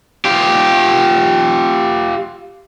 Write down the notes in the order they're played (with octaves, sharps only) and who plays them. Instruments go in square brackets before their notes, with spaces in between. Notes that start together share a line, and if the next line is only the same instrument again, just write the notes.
[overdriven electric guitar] F4 G4